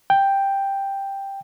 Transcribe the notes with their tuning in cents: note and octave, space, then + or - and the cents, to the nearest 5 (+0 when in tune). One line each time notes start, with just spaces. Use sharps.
G5 +5